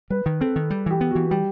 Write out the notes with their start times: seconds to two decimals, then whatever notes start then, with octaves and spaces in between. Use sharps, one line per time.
0.10 G3 B4
0.26 D#3
0.41 C4 A4
0.56 D#3
0.70 G3
0.86 E3 G4
1.01 B3
1.11 E3 F#4
1.31 G3 G4